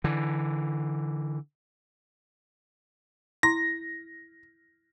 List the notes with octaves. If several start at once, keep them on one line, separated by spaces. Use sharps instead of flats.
D3 E3
E4 A#5 C6 A#6